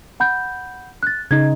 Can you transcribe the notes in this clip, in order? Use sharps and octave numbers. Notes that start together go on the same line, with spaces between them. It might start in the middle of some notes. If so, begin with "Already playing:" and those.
F#5 B5 G6
F#6 A6
C#3 D#4 G#6